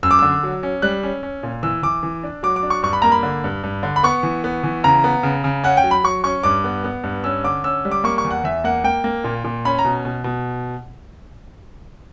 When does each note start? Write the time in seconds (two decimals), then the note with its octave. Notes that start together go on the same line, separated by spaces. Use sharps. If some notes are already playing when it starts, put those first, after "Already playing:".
0.03 F#2 E6
0.11 D6
0.19 D3 E6
0.43 F#3
0.63 C#4
0.82 G3 F#6
1.03 C#4
1.23 C#4
1.43 A#2
1.63 E3 E6
1.83 E3 D6
2.03 E3
2.23 D4
2.43 F#3 D6
2.56 D6
2.63 D4
2.70 C#6
2.83 G2 C#6
2.93 B5
3.02 A#3 A#5
3.12 B5
3.23 D3
3.44 G2
3.63 G2
3.83 D3
3.96 B5
4.03 B3 C#6
4.23 E3
4.44 B3
4.64 E3
4.84 C#3 A#5
5.04 B3
5.23 C#3
5.44 C#3
5.64 C#4 F#5
5.77 G5
5.84 F#3
5.91 B5
6.04 F#3 C#6
6.24 C#4 C#6
6.43 G2 D6
6.64 B3
6.84 B3
7.04 G2
7.24 C#4 E6
7.44 D3 D6
7.64 C#4 E6
7.85 G3
7.91 D6
8.04 A#3 C#6
8.18 C#6
8.24 E2
8.31 F#5
8.44 E2 E5
8.64 A#3 F#5
8.84 A#3 G5
9.04 A#3
9.24 A#2
9.44 A#2
9.65 C#4 B5
9.79 A#5
9.85 B2
10.05 B2
10.24 B2